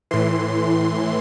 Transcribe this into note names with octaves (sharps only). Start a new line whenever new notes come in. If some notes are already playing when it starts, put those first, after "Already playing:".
A2 E3 C6